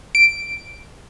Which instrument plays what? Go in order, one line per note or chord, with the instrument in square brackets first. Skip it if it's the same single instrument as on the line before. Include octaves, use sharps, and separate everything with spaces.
[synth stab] D7